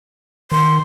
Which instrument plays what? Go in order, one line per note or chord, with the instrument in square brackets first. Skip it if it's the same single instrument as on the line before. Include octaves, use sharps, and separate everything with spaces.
[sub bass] D#3 [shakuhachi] C6